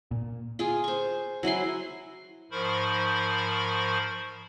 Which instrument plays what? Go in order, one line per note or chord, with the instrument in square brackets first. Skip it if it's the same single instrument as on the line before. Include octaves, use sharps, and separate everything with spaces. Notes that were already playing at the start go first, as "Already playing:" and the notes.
[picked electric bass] A#2
[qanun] F4 G#4
C5 C#6
F#3 E4 G#5 C6
[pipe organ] G#2 F3 A#4 C5 B5 C#6